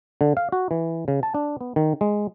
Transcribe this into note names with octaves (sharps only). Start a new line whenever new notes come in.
D3
F5
F#4
E3
C#3
A5
D4
B3
D#3
G#3